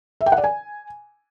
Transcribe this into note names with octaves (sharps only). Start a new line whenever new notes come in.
E5
G5
F#5
D5
G#5